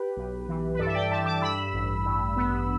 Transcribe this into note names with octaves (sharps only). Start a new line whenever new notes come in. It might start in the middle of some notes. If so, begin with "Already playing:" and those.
Already playing: G4 B4
B1
E3
B4
G2 A4 D5
E5
D5 G5
G2 E5 A5
A5 D6
G2 B5 E6
A1
G2
B3